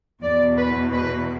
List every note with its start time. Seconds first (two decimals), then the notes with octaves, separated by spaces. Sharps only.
0.22 E2 B2 D5
0.57 B4
0.93 B4